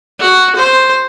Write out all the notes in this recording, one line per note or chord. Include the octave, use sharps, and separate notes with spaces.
F#4
C5